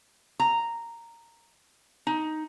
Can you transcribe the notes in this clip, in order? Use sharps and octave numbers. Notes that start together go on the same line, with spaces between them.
A#5
D#4